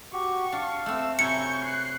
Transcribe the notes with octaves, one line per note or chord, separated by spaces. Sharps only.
F#4 G4 C#6
D4 F5
A3 C4 E6
C3 F#3 E4 G#5 C#6 G6 C#7
F#6 C7